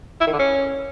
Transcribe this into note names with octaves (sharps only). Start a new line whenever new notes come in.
E4
D#3
D3
C#4